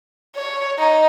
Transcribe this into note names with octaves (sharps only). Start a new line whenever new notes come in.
C#5
D#4